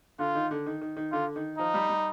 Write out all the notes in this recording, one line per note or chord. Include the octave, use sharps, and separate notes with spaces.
D3 F4
D#3
D3
D#3
D#3
D#3
D3 F4
D#3
F3 D#4
G3
G3